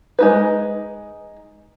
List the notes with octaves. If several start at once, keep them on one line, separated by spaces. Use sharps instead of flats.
G#3 D#4 B4